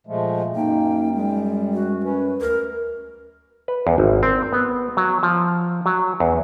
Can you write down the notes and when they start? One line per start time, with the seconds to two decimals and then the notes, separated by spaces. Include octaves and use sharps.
0.07 A#2 F3 G#3 A3
0.56 F#2 A#3 D#4 G5
1.15 G3 G#3
1.74 F#4
2.03 C#4 B4
2.41 D2 A#4
3.68 B4
3.87 E2
3.98 G#1
4.23 C4
4.53 B3
4.97 F#3
5.23 F3
5.86 F#3
6.20 E2